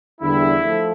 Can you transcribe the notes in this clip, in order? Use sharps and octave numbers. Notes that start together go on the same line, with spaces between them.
E2 D3 G3 E4
F3 A3